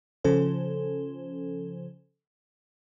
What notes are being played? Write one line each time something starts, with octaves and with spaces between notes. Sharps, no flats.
C#3 F3 C#4 A4 C5